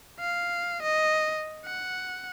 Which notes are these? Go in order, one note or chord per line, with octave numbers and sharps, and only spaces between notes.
F5
D#5
F#5